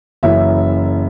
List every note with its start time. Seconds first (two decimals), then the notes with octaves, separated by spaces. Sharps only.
0.23 F#1 F#2 E3 E5